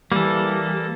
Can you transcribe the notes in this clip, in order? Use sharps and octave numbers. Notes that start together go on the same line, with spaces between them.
E3 G3 A#3 A4